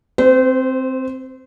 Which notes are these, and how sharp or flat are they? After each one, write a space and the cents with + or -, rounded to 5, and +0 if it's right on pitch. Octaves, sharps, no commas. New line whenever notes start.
C4 +0 C5 -35